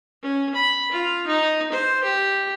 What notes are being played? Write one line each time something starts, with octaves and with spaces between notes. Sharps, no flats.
C#4
B5
F4
D#4
C5
G4